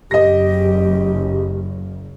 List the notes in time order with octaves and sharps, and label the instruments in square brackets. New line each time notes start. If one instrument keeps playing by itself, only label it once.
[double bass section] F#1 [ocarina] G4 [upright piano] D#5 A#6